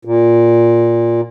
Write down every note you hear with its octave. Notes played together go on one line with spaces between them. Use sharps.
A#2